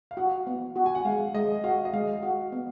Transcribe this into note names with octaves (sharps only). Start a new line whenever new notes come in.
F5
F#4 F#5
B3
F#4
G#5
F#5
G#3 F5
G#3 D#5
F#4 F5
D#5
G#3 F5
F#4
B3